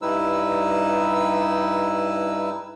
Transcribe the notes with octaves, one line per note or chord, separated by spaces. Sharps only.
G2 G3 D#4 E4 B4 E6